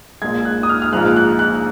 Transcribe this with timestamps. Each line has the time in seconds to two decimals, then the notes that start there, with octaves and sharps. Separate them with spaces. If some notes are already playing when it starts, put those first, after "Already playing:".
0.22 A#1 A#2 G#3 G#6
0.45 F#6
0.63 D#6
0.69 F6
0.82 F6
0.92 A#1 G#2 F3 G#3 F#6
1.16 F#6
1.39 F#6